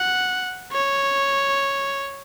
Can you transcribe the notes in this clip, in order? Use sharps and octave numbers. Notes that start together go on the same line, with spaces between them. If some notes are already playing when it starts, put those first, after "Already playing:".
Already playing: F#5
C#5